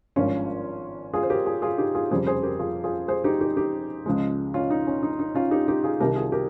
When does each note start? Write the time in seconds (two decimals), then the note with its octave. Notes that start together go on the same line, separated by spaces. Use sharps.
0.16 G#1 G2 F3 G#3 C#4 F4
1.13 F4 G#4
1.23 C5
1.30 G4 A#4
1.46 F4 G#4
1.62 F4 G#4
1.78 D#4 G4
1.95 F4 G#4
2.11 F1 F2 C#3 G3 G#4 C5
2.27 G#4 C5
2.43 G4 A#4
2.59 F4 G#4
2.84 F4 G#4
3.08 G#4 C5
3.24 D#4 G4
3.41 D#4 G4
3.57 D#4 G4
4.06 C#2 C#3 F3 G#3
4.54 C#4 F4
4.70 D#4
4.87 C#4
5.03 D#4
5.19 D#4
5.35 C#4 F4
5.51 D#4 G4
5.68 D#4 G4
5.84 F4 G#4
6.00 C2 C3 D#3 G4 A#4
6.16 F4 G#4
6.32 G4 A#4